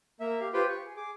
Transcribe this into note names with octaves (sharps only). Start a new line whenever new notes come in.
A#3 E5
G4 F5
F4 G4 B4 C5 G5
C#6
G#4
G#4 D6